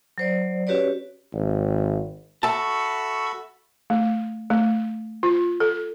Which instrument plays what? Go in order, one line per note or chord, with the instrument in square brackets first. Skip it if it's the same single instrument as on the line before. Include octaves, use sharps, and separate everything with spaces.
[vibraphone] F#3 C5 D5
C#4 F#4 G4 B4 C#5 D5
[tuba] G#1
[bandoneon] F#4 A4 B5 [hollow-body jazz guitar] E5 A5 [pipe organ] C#6 E6
[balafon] A3
A3
F4
A4